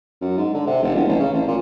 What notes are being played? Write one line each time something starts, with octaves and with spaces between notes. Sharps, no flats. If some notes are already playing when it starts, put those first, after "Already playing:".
F#2
G#2
D3
C3
F1
E1
A1
C#3
A1
A#2